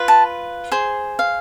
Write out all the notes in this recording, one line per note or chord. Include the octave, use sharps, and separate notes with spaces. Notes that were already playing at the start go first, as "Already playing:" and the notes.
Already playing: F4 B4
A5
G#4 C5
F5